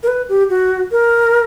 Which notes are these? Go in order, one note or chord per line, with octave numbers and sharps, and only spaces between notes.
A#4
B4
G4
F#4
A#4